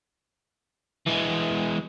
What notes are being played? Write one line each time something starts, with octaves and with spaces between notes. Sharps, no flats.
E3 G#3